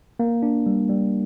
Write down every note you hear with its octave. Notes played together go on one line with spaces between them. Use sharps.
A#3
D4
G3
G3